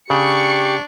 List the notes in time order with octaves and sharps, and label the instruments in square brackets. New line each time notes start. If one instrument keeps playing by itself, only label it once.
[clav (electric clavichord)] C#3 [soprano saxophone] D4 [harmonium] G4 [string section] C#6 C#7